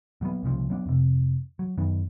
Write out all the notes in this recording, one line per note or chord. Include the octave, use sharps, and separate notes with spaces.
A#2 F#3 G3 B3
C2 A#2 C#3 F3
F#3 B3 D4
F2 C3
F#3
F#2 D#3 B3